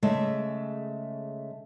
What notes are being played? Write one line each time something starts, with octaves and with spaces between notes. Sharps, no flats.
C#3 G#3 A3 E5